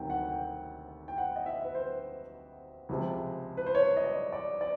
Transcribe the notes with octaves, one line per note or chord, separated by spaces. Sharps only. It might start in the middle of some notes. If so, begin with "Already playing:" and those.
Already playing: D2 C3 D#3 F#3 A3 G5
F#5
G5
G5
F#5
D#5
E5
B4
C5
C#2 C3 F3 G#3
B4
C5
C#5
D#5
D5
D5
D5